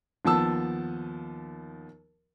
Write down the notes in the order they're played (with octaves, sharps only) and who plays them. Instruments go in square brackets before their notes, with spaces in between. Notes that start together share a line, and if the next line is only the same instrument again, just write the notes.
[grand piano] D#2 F3 B3 A5 E6